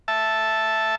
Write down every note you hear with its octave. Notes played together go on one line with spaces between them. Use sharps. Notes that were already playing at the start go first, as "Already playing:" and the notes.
E5 A5